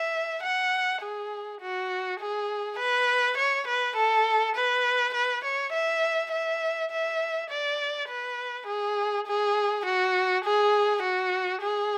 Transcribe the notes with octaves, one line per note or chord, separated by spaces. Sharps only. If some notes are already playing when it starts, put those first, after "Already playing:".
Already playing: E5
F#5
G#4
F#4
G#4
B4
C#5
B4
A4
B4
B4
C#5
E5
E5
E5
D5
B4
G#4
G#4
F#4
G#4
F#4
G#4